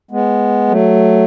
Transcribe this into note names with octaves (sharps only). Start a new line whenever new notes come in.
G#3 B3
F#3 A3